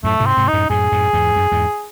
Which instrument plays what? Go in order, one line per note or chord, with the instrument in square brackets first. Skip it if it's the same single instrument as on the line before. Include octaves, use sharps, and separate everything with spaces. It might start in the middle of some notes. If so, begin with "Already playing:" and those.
[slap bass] F#2 A2 [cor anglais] A3
[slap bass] G#2 C3
[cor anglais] C4
[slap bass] G#2 C3
[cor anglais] D#4
[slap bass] F#2 A2
[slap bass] F#2 A2 [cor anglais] G#4
[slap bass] F#2 A2
E2 G#2
F#2
E2 G#2